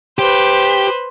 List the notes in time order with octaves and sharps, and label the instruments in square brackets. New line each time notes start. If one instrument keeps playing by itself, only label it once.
[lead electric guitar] G4 [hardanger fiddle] B4 C5